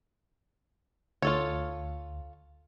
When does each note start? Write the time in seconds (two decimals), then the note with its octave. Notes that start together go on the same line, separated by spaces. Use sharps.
1.22 D2 F4 A4 C#5